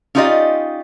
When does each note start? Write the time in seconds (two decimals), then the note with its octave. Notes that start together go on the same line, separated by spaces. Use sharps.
0.15 C#4 D#4 F4 G4 D5 D#5